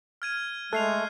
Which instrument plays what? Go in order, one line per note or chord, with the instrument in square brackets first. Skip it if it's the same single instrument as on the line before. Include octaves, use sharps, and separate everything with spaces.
[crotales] F6 G#6 D#7
[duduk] G#3 [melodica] A3 [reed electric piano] A4 [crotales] F#6 C7 F7